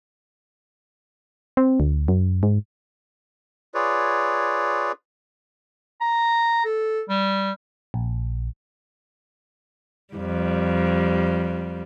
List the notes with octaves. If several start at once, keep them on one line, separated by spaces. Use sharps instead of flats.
C4
D2
F#2
G#2
F4 G#4 B4 C#5 D5
A#5
A4
G3
A#1
F2 G3